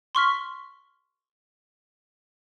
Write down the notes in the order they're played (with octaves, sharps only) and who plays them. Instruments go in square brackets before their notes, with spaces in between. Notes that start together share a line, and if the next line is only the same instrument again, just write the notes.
[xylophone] C6 C#6 F6 B6